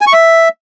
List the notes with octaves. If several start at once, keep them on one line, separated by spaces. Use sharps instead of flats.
G#5
C#6
E5